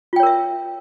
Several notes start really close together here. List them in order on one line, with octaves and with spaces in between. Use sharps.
F4 G5 C#5 A#4 E5